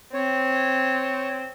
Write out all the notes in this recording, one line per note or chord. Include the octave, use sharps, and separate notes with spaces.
C4 C#5